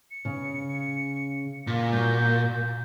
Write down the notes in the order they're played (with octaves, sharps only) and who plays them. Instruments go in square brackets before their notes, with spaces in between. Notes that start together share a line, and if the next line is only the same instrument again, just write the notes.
[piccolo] C#7
[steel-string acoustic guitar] C#3
[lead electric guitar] A#2
[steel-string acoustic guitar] A#3 F#4 [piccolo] G6